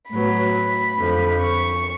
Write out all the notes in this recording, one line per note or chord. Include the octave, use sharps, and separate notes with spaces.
A2 F#3 B3 B5
F2 D3 F3
C#6